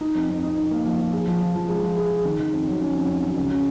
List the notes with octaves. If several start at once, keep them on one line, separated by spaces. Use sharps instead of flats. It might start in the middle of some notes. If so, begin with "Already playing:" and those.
D#4
F2
F2
D#4
D#4
A#3
F3
F3
G#4
F3
F3
F3
G#3
F3
G#4
G#4
D#3
D#3
F2
F#3
C#4
F2
F2
F#3
C#2
C#3